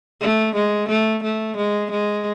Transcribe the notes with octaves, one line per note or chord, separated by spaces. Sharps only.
A3
G#3
A3
A3
G#3
G#3